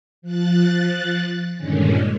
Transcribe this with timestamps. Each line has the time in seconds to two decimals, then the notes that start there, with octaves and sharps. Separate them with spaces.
0.22 F3 F#6 A6
1.56 G2 A#2 D3 D#3 G#3 C#4